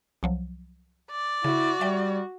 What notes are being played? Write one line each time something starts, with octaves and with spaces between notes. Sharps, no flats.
C2 F3 F#3
D5
C#3 E4 F#4
G3 E5 G5